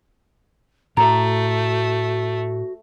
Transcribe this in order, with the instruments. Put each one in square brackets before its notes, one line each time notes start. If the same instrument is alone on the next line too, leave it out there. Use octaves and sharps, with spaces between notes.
[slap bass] A2 [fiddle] A3 [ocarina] F#4 [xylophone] A#5